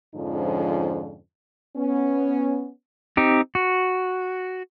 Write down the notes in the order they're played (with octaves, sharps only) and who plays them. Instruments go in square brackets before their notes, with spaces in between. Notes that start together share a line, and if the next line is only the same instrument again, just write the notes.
[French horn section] F2 G#2 D3 F3 C#4 D#4
B3 C#4
[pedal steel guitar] C4 D#4 G4
F#4